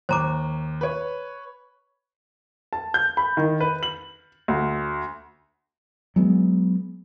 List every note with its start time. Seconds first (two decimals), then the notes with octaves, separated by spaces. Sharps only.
0.09 D#2 C5 A#5 D6
0.81 B4 C#5
2.73 A5
2.94 G6
3.17 B5
3.37 D#3
3.61 B4
3.83 F#7
4.48 D2
6.16 F#3 G#3 B3